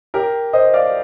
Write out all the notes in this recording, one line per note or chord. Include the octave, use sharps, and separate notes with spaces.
G4 A#4
C5 D#5
D5 F5